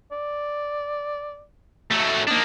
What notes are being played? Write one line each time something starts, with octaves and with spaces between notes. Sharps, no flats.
D5
F#3 A3
A#3 D4 D#4